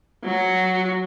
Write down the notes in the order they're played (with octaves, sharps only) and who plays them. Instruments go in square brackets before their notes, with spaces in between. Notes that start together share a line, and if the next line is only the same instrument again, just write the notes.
[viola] F#3 F#4